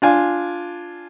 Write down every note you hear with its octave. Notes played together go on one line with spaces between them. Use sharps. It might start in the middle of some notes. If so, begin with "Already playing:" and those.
D4 F4 G#5